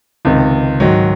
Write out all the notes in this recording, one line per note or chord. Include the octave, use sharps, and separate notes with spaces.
C#2 C3 D#3
G#2 D#3 F#3